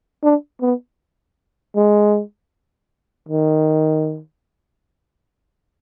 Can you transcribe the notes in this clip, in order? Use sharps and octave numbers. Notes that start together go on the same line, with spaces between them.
D4
B3
G#3
D#3